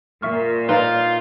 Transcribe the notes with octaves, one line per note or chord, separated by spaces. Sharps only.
A#2 E5 C#6 F6
D#4 F4 B4 D5 F5